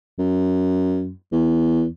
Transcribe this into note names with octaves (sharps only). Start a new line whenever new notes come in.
F#2
E2